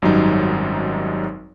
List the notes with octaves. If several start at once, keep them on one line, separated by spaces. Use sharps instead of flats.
G#1 F#2 F#3 G3 D#4